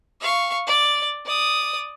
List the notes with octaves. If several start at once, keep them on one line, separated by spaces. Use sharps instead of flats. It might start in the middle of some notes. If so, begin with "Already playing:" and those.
F5 C#6
D5
D5 D#6